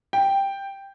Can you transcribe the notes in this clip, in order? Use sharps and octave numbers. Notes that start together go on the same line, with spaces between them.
G5